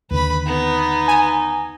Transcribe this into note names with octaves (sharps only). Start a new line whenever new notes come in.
D#2 D3 B4 B5
B3 D#4
G#5